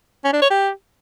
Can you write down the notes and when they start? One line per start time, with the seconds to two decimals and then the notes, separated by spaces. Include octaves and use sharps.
0.24 C#4
0.33 D4
0.42 C#5
0.50 G4